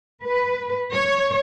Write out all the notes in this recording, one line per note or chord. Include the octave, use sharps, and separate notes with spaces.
B4
C#5